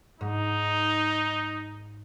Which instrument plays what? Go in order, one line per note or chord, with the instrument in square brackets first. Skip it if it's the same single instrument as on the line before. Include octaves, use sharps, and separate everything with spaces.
[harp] G#2 [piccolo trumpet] D#4